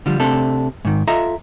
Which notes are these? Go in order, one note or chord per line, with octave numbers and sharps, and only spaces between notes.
D3 F3 G3
C3 A3 D4 A4
G#2 D#3
F4 A4 D#5 E5 A#5